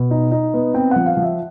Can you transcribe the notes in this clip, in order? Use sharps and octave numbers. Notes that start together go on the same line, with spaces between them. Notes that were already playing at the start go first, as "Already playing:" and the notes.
Already playing: B2
D#4
D#4
B3
C4 G5
F3 F#5
F5
F3
E5